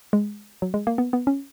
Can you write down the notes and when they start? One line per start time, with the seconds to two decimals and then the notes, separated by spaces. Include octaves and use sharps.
0.13 G#3
0.62 F#3
0.74 G#3
0.87 A#3
0.98 B3
1.13 B3
1.27 C#4